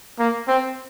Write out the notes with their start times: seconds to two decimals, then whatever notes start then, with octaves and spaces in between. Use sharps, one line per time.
0.19 A#3
0.48 C4